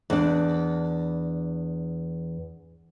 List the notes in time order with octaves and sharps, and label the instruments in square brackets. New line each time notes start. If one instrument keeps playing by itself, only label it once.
[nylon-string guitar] E2 D4